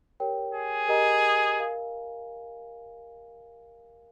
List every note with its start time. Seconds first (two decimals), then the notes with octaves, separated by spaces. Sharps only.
0.20 G4 A#4 C#5 G5
0.54 G#4
0.88 G4 A#4 D#5 A#5
1.58 A#4 F5 G#5